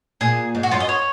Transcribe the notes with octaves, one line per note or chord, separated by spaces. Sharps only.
A#2 G#4
G#2
F#4
F#2 F4
D#5
C#5